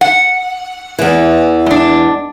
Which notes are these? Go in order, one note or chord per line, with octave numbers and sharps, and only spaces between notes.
F#5
E2 E3
G#3 D4